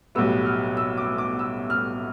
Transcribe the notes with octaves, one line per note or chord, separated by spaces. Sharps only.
B1 A2 G3 B3 E6
F6
E6
D6
D6
E6
F6